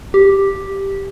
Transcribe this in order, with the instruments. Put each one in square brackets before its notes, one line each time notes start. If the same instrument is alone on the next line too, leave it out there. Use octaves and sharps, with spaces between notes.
[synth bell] G4